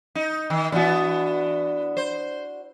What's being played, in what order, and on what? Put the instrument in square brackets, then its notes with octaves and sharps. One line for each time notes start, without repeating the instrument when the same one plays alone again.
[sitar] D#4
D#3
[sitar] E3 B3 [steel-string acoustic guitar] D4 F#4
[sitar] C5